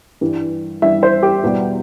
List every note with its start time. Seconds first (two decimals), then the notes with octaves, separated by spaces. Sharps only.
0.21 G2 E3 G3
0.82 G2 E3 G3 E5
1.03 C5
1.23 G4
1.43 E2 B2 G3